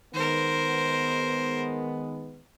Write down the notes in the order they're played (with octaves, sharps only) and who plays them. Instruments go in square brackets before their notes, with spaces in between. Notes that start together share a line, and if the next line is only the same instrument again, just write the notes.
[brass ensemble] D#3 G#3 B3 [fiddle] A#4 C5